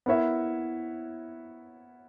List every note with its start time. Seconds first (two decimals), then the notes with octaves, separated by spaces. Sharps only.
0.06 B3 E4 A#4 C#5 E5